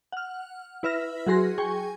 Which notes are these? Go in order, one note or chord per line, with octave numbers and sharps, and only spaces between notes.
F#5 F6
E4 B4 E5 F6 A#6
F#3 F#4 G#4 C6 A#6
G#4 G5 G#5 C#6